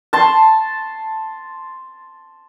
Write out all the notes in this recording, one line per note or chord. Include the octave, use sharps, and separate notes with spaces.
A5 C6